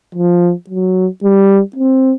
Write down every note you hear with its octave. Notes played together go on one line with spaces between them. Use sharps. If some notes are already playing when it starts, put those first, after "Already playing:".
F3
F#3
G3
C4